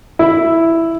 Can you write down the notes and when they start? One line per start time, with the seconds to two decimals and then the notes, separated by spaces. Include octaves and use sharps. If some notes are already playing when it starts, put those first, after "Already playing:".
0.19 E4